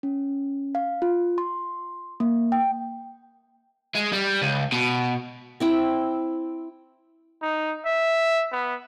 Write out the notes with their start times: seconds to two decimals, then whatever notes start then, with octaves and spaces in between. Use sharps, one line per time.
0.03 C#4
0.75 F5
1.02 F4
1.38 C6
2.20 A#3
2.52 G5
3.95 G#3
4.13 G3
4.42 C#2
4.72 B2
5.60 C4 E4 G5
7.42 D#4
7.86 E5
8.52 B3